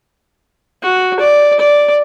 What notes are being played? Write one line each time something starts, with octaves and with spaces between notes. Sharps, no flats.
F#4
D5
D5